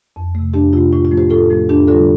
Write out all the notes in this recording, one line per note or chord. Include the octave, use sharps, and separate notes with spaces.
F2
C3 A3
F2 D4 G4
C3 A3 F4
A2 F4
F4
F3 A3
G4 C5
A2 F4 A4
F3 A3
F2 D4 G4
D3 G3 F4 A4